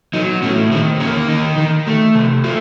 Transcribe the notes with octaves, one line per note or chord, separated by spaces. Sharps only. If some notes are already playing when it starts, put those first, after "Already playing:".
F#3 D#4
A2 C#4
D#3 C4
A#3 C#4
D#3 D#4
D#3
A3
C3
A3 F4